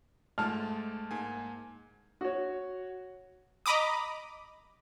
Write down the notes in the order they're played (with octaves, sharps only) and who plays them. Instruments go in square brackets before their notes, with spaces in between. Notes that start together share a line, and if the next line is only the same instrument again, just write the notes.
[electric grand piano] G#2 G#3 A3 [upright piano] A5 F6
[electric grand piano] G#2 A#3 G#5
[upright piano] F#4 C#5
[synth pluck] D#5 A#5 B5 D6 D#6